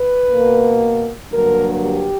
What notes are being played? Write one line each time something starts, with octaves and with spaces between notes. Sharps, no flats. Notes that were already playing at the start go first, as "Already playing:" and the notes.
Already playing: B4
B2 A#3
G2 D3 F#3 A#3 A#4
G4